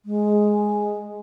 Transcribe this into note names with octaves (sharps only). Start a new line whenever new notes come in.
G#3